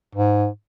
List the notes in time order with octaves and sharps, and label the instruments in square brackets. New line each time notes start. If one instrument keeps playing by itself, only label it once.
[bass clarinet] G#2